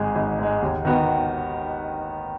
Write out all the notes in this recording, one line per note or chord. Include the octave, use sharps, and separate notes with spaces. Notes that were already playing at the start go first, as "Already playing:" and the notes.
Already playing: G#1 G#2 G#3
G#1
G#2 G#3
D#2
D#3 B3 F#4